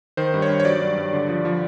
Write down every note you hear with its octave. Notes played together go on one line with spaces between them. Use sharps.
D#3 C5
G2
C#5
G2
C#5
F#3 D5
G2
G2
D3
F3
F3